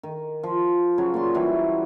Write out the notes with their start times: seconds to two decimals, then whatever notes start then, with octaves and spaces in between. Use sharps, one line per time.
0.03 D#3
0.43 F3
0.98 C#3 F#3 C#5 F5
1.14 A#2 D5 C6
1.35 E3 F#3 G3 E4